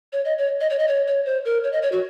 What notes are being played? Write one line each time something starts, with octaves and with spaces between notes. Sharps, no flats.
C#5
D#5
C#5
D#5
C#5
D#5
C#5
C#5
C5
A#4
C#5
D#5
C#5
F#4